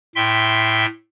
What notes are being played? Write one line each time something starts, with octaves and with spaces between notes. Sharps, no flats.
A2 E5 G5 C6